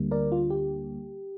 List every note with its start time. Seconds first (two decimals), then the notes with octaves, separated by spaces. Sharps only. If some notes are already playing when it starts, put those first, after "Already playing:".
Already playing: D2 D3 G3 A#3
0.11 A#4 D5
0.32 F4
0.50 G4